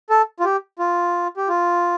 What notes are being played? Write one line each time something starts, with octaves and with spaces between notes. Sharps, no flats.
A4
F4
G4
F4
G4
F4